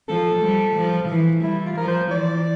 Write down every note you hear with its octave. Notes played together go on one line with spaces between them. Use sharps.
F3 A4
G3
F3
E3
G3 E4
F4
F3 A#4
C5
E3 D5